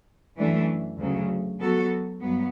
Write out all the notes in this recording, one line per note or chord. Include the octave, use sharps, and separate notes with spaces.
F#2 E3 A3 D4
D2 C#3 F#3
F#3 B3 F#4 A4
G2 F#3 B3